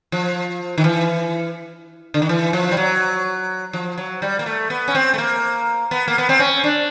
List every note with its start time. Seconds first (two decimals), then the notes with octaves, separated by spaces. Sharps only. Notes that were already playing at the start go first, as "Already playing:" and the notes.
0.12 F3
0.78 D#3
0.84 E3
2.14 D3
2.22 D#3
2.29 E3
2.53 F3
2.71 G3
2.77 F#3
3.73 F3
3.98 F#3
4.22 G3
4.39 A#3
4.46 A3
4.70 B3
4.88 C#4
4.95 C4
5.14 A3
5.18 A#3
5.91 B3
6.08 A#3
6.18 B3
6.29 C4
6.39 C#4
6.64 D4